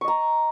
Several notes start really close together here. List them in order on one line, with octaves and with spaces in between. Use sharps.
C#6 D#5 A#5